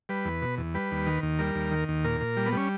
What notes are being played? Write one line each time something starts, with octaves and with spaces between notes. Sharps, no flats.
G3 B4
E2
B2
E2
G3 B4
D#2
D#3
D#2
G3 A#4
D#2
D#3
D#2
A#2 A#4
A#2
G3
B3
G3 C#4